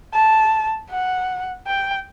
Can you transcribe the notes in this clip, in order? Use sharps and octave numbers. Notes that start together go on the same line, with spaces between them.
A5
F#5
G5